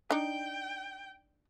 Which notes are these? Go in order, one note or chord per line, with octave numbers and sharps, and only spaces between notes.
D4 D#4 G5